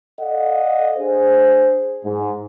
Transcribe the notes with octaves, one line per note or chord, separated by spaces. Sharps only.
A4 D5 D#5 F5 F#5
D4 G#4 C5
G#2